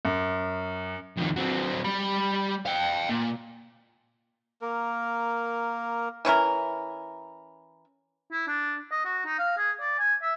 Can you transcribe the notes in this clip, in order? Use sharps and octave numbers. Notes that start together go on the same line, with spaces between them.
F#2
F2 D#3
F#3 C4
G3 B5
F5 G5
A#2
A#3 A#4
E3 C#4 E4 A#4
E4
D4
D#5
F#4
D#4
F5
G#4
D5
G#5
E5